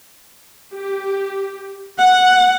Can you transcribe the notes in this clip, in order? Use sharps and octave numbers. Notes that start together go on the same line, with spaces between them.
G4
F#5